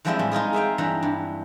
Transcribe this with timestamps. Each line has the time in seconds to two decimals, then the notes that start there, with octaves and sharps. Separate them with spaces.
0.05 E3 F3 G3 G#3 C4 E4
0.19 A2 G3
0.31 G#3 D#4 F4 G#4
0.53 G#4 E5 F5 G5
0.78 G2 E3 G3 A#5
1.03 G2